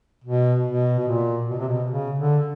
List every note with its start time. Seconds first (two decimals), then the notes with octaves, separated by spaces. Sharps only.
0.24 B2
0.66 B2
0.99 B2
1.08 A#2
1.50 B2
1.59 C3
1.68 B2
1.91 C#3
2.19 D3